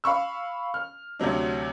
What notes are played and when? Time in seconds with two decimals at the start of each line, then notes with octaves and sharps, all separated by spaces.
0.04 F5 B5 C#6 E6
0.74 F6
1.19 D2 C3 F#3 D4